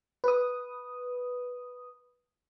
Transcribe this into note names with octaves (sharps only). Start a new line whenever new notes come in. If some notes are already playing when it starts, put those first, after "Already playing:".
B4 D#6